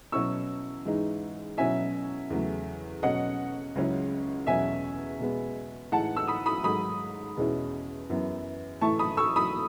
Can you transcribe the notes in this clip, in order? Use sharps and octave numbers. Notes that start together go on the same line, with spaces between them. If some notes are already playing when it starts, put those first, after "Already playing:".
B2 F#3 C#4 E4 C#6 E6
G#2 E3 G#3 D#4
B2 F#3 C#4 E4 E5 G#5
E2 C#3 F#3 A3
B2 F#3 C#4 D#5 F#5
C#2 C#3 F#3 C#4 E4
E2 B2 F#3 C#4 E5 G#5
B2 G#3 B3
A2 E3 G#3 D#4 F#5 A5
E6
B5 D#6
B5 D#6
G#2 D#3 F#3 B5 D#6
E2 B2 G#3 C#4 E4
F#2 E3 B3
A2 E3 A3 E4 A5 C#6
B5 D#6
C#6 E6
B5 D#6